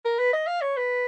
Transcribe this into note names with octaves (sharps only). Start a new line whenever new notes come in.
A#4
B4
D#5
F5
C#5
B4